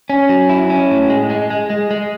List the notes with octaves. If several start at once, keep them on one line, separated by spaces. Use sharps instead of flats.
C#4
F#3
E4
C#4
A2
G#3
G#3
G#3
G#3
G#3